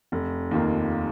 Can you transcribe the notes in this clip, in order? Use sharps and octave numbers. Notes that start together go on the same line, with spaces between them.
F1
D#2 D#3 A#3 F4